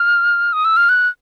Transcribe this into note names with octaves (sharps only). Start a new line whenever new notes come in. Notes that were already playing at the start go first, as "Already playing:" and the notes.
Already playing: F6
D#6
E6
F6
F#6